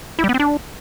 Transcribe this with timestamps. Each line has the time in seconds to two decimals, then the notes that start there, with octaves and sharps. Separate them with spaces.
0.19 E4
0.24 G3
0.29 B3
0.34 C4
0.40 D4